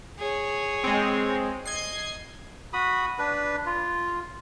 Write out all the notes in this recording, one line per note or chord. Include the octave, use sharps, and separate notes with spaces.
G#4 C#5
G#3 C4
D#5 G#6 C7
F#4 B5 D#6
D4 B4
F4